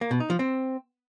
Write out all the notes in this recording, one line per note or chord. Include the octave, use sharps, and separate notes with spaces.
A#3
B2
D#4
F3
C4